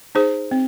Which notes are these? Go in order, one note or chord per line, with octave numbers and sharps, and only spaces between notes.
D#4 G#4 C5
C4